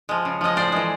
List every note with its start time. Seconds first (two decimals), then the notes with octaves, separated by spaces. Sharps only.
0.09 F3 G#3
0.25 C#3
0.41 F3 G#3 D#5
0.56 A2 C5 D5
0.72 E3 G#3